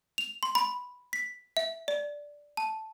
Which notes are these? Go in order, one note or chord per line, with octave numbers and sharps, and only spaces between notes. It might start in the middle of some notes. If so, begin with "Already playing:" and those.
F7
C6
B5
B6
E5
D5
A5